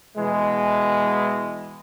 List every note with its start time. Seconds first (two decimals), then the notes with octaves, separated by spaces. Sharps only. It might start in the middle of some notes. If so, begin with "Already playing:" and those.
0.17 B2 E3 G#3